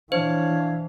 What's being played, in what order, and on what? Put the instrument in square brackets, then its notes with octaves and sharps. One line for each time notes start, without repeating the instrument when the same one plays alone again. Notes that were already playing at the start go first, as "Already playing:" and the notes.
[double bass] E3 [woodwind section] D4 E4 F5 [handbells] C5 [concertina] C#5